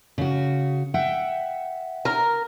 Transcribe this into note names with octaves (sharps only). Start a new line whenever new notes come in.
C#3 F#4
E5 F#5 G5
A#4